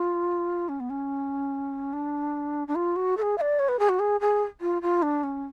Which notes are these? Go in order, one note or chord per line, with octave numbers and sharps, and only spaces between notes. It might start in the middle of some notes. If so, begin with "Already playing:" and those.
Already playing: F4
C#4
B3
C#4
D4
D4
F4
F#4
A4
G#4
F5
D5
C#5
B4
G#4
F#4
G#4
G#4
F4
F4
D4
C#4